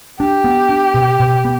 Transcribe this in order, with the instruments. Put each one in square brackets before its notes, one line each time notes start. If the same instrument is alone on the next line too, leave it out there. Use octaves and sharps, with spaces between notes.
[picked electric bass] D4 [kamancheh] G4
[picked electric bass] B3
D4
B2
B2
B3